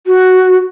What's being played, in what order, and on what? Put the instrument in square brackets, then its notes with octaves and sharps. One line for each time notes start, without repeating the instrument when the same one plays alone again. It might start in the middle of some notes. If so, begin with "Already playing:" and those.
[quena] F#4